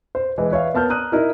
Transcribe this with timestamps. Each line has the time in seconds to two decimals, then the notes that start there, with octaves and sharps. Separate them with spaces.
0.15 C5
0.38 E3 G#3
0.51 B4 C#5 E5 F5
0.74 A#3 B3 A5 F6 G6
0.90 A#5 D#6 F#6 D#7
1.12 D#4 E4 A#4